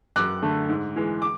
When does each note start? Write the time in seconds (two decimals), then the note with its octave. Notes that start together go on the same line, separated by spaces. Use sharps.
0.16 F#2 D6 F#6
0.42 D3 A3
0.69 G#2
0.96 E3 G#3
1.22 D6